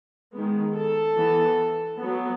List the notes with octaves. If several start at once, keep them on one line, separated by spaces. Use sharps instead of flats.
D#3 G#3 B3
A4
E3 B3
F#3 B3